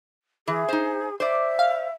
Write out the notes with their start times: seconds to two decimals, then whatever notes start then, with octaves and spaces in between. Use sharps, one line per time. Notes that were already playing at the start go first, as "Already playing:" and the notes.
0.48 E3 G#4
0.69 D#4 C5
1.20 C5 D5 E5
1.59 F5